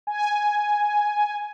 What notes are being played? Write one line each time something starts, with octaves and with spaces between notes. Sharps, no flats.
G#5